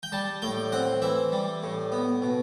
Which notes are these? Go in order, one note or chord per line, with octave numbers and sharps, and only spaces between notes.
G5
G3 A5
A2 G5
C4 F#5
E3 E5
G3
A2
B3
B2